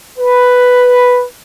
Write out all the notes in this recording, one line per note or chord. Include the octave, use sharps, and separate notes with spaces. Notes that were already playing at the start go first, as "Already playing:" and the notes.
B4